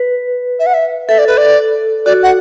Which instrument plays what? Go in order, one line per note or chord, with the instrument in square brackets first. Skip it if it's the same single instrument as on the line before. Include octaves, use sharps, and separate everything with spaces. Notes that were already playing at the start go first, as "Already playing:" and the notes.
Already playing: [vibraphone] B4
[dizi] E5
F#5
E5
[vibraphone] A4 [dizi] E5
[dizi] D5
B4
D5
[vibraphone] F#4 [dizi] D5
[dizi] F#5